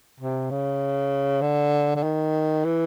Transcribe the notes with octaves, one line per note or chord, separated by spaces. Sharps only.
C3
C#3
D3
D3
D#3
E3